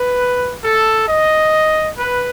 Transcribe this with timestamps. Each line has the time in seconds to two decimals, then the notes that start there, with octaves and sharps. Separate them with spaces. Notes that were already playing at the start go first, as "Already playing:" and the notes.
Already playing: B4
0.64 A4
1.08 D#5
1.98 B4